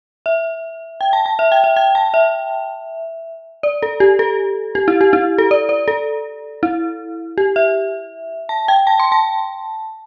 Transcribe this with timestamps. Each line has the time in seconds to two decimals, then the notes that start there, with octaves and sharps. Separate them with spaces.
0.26 E5
1.01 G5
1.13 A5
1.26 A5
1.39 E5
1.52 G5
1.64 E5
1.76 G5
1.95 A5
2.14 E5
3.63 D5
3.82 A4
4.00 G4
4.19 A4
4.75 G4
4.88 E4
5.01 G4
5.13 E4
5.38 A4
5.51 D5
5.69 D5
5.88 A4
6.63 E4
7.38 G4
7.56 E5
8.49 A5
8.68 G5
8.87 A5
9.00 C6
9.12 A5